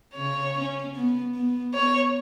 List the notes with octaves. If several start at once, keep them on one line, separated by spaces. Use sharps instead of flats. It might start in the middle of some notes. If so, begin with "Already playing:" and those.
C#3 C#5
C#4
B3
B3
B3 C#5